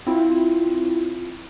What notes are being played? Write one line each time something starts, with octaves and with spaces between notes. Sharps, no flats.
C4 E4 F4